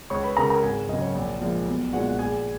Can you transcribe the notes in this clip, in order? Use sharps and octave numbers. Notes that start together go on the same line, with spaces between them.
C#2 C#5 C#6
B4 B5
C#3 G#3 A#4 A#5
A#4 A#5
G#1 G#4 G#5
F#2 C#3 D#5
C#5
A#1
A#2 F3 G#3
B1
A#2 G#3 F#4 F#5
F#5
A#1 G#4 G#5